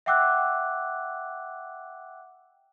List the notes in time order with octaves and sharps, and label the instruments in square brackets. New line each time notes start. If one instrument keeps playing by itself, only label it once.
[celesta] E5 F#5 G5 D6 E6 F#6